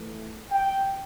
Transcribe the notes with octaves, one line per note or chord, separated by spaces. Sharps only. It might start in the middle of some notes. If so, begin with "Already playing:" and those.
Already playing: E3 A3
G5